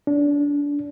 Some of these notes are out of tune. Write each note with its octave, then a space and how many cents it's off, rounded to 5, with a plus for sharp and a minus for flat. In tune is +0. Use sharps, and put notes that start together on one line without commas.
D4 -25